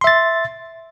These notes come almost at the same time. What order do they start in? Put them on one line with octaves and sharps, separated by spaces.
C6 E5 A6